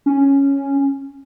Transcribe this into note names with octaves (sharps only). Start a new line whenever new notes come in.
C#4